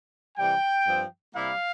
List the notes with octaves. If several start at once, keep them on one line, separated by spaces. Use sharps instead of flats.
C3 E3 G3 G5
G2 F3 C4
C3 G3 A#3 E4 F5